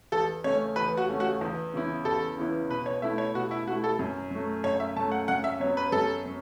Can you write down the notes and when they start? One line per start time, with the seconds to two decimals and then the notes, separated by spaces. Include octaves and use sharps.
0.12 E2 A4
0.44 C#3 A3 C#4 C#5
0.76 E2 B4
0.97 F#4
1.09 C#3 A3 C#4
1.20 F#4
1.41 E2
1.73 C#3 E3 B3 E4
2.05 E2 A4
2.37 C#3 E3 B3 E4
2.70 B2 B4
2.86 C#5
3.02 A3 E4 E5
3.18 C#5
3.35 B2 F#4
3.51 E4
3.66 A3 F#4
3.71 E4
3.84 A4
3.99 F#2
4.31 F#3 A3
4.64 F#2 C#5
4.80 E5
4.96 F#3 A5
4.99 A3
5.12 F#5
5.28 F#2 F#5
5.44 E5
5.60 F#3 B3 C#5
5.77 B4
5.92 F#2 A4
6.26 F#3